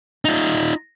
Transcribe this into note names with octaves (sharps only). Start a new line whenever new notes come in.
D#4 F4